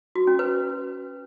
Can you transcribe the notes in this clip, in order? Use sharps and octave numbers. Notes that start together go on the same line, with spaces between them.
F#4
C#4
B4